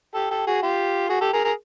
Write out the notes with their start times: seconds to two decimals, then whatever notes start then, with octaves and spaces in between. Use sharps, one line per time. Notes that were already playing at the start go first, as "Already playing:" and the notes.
0.14 G4 A4
0.30 G4 A4
0.47 F#4 G#4
0.62 F4 G4
1.09 F#4 G#4
1.21 G4 A4
1.33 G#4 A#4
1.44 G#4 A#4